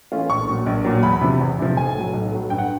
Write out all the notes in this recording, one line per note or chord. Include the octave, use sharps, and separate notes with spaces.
E3 A3 C#4 F4
A#1 C#6
A#2 F#3
A#1
A#2 F#3
E2 B5
C3 F3
E2
C3 F3
B1 G#5
A2 F#3
B1
A2 F#3
G2 G5
F#5